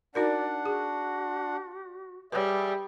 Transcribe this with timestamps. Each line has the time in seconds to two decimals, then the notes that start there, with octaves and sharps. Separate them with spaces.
0.15 D4 D#4 F#4 A#4 D5 F#5
0.66 F#4 G#4
2.32 G3 G#4 B4 C#5 D5 E5